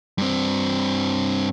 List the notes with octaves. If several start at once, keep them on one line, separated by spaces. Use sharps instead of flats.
G2 C4